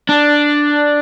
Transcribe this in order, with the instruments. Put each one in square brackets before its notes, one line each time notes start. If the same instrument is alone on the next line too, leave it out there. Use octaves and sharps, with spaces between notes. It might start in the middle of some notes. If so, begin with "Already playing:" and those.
[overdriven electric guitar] D4